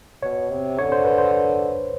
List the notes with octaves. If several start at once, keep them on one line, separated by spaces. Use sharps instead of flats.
B2 C#5
C3
D3 C#5
C5
B4
C5